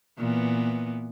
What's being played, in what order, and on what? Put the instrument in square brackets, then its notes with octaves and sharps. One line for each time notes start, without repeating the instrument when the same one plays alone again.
[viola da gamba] A#2 E3 B3